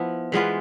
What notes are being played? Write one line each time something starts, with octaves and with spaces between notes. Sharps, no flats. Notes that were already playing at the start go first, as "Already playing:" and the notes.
Already playing: F3 B3 E4
E3 G#3 B3 F4